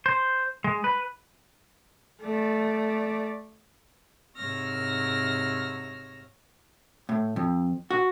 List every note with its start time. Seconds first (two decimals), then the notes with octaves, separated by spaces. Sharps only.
0.06 C5
0.64 G#3
0.84 B4
2.22 A3 D5
4.36 G#2 C3 C#5 E6 F6 A#6
7.09 A2
7.36 F2
7.91 F#4